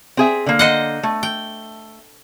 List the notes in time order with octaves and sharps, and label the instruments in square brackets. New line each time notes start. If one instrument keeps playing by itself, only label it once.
[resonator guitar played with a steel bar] C4 G#4 E5
D3 A#3
[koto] C5 D#5 F#5
[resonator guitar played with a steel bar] A3
[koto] G5